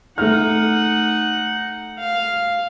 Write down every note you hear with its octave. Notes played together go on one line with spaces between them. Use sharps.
A3 D#4 F#5 F6
F5